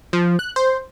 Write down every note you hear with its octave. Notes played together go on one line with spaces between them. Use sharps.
F3
F#6
C5